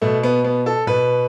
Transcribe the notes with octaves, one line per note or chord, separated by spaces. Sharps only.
B2 A3
B3
B3
A4
B2 B4